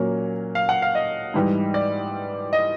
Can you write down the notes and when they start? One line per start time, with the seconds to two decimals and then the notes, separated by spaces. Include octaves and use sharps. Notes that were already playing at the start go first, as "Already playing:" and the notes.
Already playing: A#2 F#3 A#3 C#4
0.55 F5
0.69 F#5
0.82 F5
0.95 D#5
1.34 G#2 E3 G3
1.74 D5
2.53 D#5